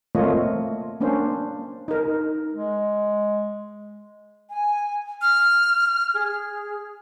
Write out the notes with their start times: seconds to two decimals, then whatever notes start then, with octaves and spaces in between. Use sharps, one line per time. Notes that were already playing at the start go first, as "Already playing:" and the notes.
0.15 A3 A#3 C4 F4 C#5 D#5
1.01 A#3 C#4 D4 C5
1.88 D#4 A#4
2.54 G#3
4.50 G#5
5.21 F6
6.14 G#4